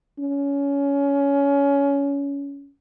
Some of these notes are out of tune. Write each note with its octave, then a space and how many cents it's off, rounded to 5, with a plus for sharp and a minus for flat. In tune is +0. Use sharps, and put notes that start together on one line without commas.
C#4 +20